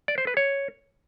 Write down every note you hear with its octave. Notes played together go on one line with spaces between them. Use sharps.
D5
C5
B4
C#5